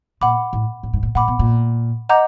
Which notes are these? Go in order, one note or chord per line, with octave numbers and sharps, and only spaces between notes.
A#2 F#5 B5 D6
A2
A2
G#2
A2
A#2 F#5 B5 D6
B2
A#2
D#5 F#5 A#5 D6 G6